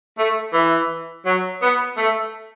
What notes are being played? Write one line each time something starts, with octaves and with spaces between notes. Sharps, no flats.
A3
E3
F#3
B3
A3